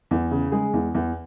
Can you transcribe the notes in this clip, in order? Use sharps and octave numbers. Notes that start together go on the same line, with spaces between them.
E2
C#3
G#3 G#4
E2
E2